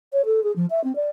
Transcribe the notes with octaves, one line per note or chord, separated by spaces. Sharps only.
C#5
A4
G#4
F3
E5
C4
D5